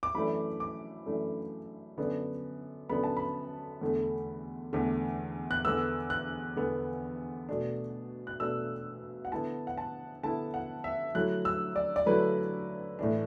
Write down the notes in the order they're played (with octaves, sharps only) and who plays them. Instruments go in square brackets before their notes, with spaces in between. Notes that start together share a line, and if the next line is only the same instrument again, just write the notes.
[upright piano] D6
F#2 E3 A3 D4 B5
D6
F#2 E3 A3 D4
F#2 D3 B3 D4
F#2 D3 B3 D4 B5
A5
B5
E2 D3 A3
E2 D3 A3
F#6
E2 D3 B3 E6
F#6
E2 D3 B3
B2 A3 D4
F#6
B2 A3 D4 E6
F#5
D3 B3 E4 A5
F#5
A5
D3 B3 E4 A5
F#5
E5
D3 F#3 A3 E4 F#6
E6
D5
D5
D3 F#3 A3 E4 B4
A2 E3 D4